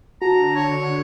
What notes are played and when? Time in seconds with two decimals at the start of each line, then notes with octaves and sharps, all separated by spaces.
0.22 D3 F#4 A5 A#5
0.56 C#5